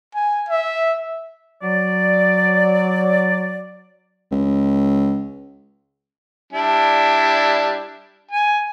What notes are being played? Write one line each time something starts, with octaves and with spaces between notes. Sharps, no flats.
G#5
E5
F#3 D5
C#2
G3 D4 E4
G#5